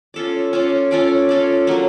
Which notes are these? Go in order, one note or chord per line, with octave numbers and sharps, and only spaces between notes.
C#4 F4 A4 D5
C#4 F4 A4 D5
C#4 F4 A4 D5
C#4 F4 A4 D5
D3 F#3 A#3